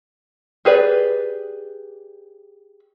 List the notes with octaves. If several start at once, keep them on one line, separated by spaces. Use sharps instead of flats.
G4 G#4 B4 D5